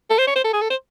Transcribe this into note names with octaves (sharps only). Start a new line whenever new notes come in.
A4
C5
C#5
C5
A4
G#4
A4
C5